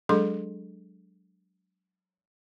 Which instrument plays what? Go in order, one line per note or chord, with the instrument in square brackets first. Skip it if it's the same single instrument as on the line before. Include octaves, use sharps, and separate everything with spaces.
[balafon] F#3 G#3 D4 G#4 A4 C6